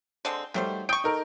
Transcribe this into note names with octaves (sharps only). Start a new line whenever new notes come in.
D3 G#3 C4
D#3 F#3 G3 A3 C5
G5 C#6 D#6 G6 D7
D#4 A4 A#4